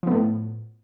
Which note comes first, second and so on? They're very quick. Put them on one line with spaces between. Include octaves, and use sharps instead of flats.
F3 B3 A2